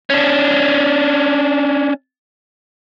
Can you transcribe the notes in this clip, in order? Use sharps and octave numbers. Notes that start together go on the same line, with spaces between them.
C#4 D4